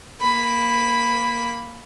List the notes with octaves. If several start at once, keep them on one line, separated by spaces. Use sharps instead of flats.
A#3 B5